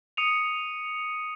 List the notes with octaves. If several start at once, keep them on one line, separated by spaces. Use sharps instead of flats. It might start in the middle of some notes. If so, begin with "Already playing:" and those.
D#6 C#7 D#7 F7